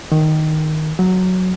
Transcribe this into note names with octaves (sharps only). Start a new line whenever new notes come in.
D#3
F#3